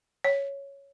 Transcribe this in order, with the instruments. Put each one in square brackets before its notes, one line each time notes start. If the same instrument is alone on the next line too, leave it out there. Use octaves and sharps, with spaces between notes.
[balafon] C#5